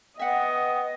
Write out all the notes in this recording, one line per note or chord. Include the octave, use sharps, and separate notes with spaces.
B3 D#5 E5 F#5 G5